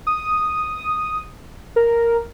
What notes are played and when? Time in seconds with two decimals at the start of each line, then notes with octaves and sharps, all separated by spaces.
0.07 D#6
1.76 A#4